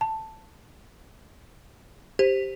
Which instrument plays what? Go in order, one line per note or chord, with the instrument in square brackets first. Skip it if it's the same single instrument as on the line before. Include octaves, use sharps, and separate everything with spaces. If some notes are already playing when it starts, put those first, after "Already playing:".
[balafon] A5
[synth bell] G4 [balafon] C5